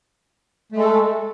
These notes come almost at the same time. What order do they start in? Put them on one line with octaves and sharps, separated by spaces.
A3 G#3 A4